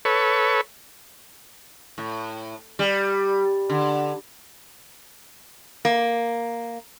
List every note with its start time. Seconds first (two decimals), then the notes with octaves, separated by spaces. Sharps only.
0.05 A4 B4 C#5
1.98 A2
2.79 G3
3.70 D3
5.85 A#3